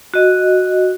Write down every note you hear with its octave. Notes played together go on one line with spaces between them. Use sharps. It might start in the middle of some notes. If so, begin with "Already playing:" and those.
F#4 D#5